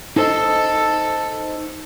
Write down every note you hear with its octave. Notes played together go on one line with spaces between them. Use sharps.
D#4 A4 C5 D#5